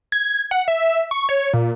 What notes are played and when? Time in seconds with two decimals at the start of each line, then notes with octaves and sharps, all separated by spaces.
0.12 G#6
0.51 F#5
0.68 E5
1.11 C#6
1.29 C#5
1.53 A#2